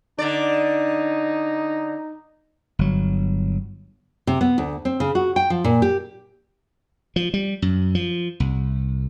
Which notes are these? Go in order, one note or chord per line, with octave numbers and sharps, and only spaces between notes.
D3 D#4 D5
G1 F#3
C3
B3
D2
C4
C#3
F#4
G5
F3
A#2
G4
F3
G3
F#2
F3
C2